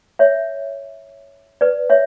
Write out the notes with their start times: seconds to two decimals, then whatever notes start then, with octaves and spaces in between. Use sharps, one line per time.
0.19 C#5 E5
1.61 B4 D5
1.90 C#5 E5